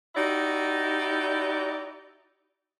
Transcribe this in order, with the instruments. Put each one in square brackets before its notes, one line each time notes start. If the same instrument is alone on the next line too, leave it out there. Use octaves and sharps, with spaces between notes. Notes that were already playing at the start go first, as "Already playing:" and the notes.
[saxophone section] D#4 E4 F#4 G4 D5